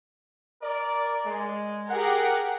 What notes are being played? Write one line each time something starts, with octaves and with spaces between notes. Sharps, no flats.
A#4 D5
G#3
G4 G#4 A#4 F#5